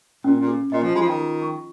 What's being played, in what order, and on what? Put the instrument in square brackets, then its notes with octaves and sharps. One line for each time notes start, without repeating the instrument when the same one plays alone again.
[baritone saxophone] A#2 [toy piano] C#4
[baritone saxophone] A#2
[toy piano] G#4
[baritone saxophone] A#2 [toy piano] D#5
[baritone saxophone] F3
[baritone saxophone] G#3 [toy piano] F4
[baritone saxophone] F3
D#3
[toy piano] G#4
C#6